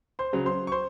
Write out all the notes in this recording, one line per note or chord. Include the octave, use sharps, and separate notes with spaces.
C5 C6
C#3 F#3
C5 C6
C#6
C5 C6